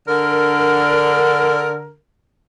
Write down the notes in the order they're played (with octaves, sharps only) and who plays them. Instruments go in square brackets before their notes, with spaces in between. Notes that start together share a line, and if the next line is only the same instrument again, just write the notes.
[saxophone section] D3 A#4